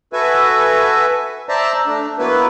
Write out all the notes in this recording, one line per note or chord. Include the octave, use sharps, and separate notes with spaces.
F#4 A4 B4 E5 G#5
C5 D5 E5 A5 A#5
A3 D4
F#3 A#3 B3 E4 B4